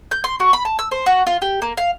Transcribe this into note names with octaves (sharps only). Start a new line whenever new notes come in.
G6
C6
F#4
B5
A5
E6
C5
F#4
F4
G4
A#3
F5